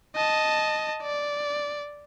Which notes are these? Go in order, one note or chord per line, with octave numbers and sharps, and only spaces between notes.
D#5 A5
D5